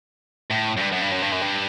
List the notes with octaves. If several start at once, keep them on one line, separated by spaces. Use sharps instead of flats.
A2
F#2
G2
F#2
G2
F#2
G2
F#2
G2